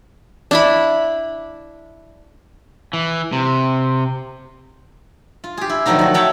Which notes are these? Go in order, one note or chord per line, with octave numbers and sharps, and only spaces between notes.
D4 E4 B5
E3
C3
F4
G4 G#4
E4
D3 D#3 F3 F#3 A3 D#4
D#3 F#4
A4 C#5 E5 F#5 G5 A5